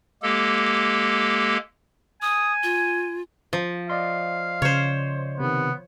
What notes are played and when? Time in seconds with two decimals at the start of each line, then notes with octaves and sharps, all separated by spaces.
0.23 G#3 A#3 G4 A4
2.22 G#5 D#6
2.63 F4
3.53 F3
3.90 D5 D#5 F5 C6
4.62 C#3 C5 C#5
5.40 C3 D#3 B3